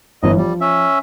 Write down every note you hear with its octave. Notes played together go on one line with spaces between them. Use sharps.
G1 E3 D#5
F3 G3
C#4 E5